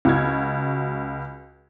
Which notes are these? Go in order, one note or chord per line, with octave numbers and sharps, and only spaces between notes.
C#2 F#4 F6 G#6